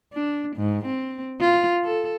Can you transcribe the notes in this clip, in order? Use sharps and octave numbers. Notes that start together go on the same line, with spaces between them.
D4
G#2
C4
F4
A4